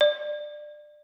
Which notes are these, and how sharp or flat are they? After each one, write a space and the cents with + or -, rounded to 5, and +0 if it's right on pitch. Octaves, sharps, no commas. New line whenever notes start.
D5 +20